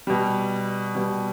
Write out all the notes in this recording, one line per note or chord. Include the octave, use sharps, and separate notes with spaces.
B2 G3
B2 G3